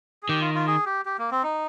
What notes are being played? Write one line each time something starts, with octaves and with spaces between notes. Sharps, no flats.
G#4
D#3 G4
F4
F4
G#4
G4
G4
A#3
C4
D#4